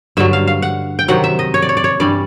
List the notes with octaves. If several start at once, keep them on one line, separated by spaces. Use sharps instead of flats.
G2 D3 F#3 E5
F5
F5
F#5
G5
C3 D#3 F#3 F#5
E5
D#5
C#5
D5
C#5
D5
C#5
G2 E3 G3 D5